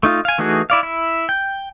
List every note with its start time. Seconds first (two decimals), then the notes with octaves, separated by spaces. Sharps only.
0.03 A3 D#4 F4
0.25 F5 G#5
0.38 E3 A3 D#4 F#4 G#4
0.70 E4 D5 F5
0.83 E4
1.29 G5